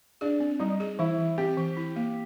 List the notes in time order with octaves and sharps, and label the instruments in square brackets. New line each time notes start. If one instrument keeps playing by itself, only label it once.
[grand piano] D4 [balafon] G#4
[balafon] C4
[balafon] G3 [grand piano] D#4
[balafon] G#4
[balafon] E3 [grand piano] E4
[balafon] E3
[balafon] C4 [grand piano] G4
[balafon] E3
E4
A#3